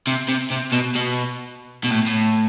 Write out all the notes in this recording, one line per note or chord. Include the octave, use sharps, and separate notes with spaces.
C3
C3
C3
B2
B2
B2
A2
A2